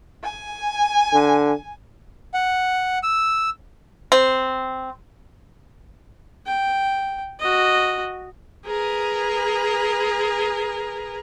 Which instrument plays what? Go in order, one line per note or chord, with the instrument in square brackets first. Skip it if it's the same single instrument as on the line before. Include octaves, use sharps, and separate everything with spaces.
[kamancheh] G#5
[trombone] D3
[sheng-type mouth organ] F#5
E6
[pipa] C4
[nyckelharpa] G5
F#4 D#5
[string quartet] G#4 A#4 B4